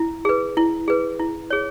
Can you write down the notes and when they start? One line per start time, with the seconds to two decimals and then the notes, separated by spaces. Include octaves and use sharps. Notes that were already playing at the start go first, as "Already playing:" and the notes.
Already playing: E4
0.25 G#4 B4
0.57 E4
0.88 G#4 B4
1.19 E4
1.50 G#4 C#5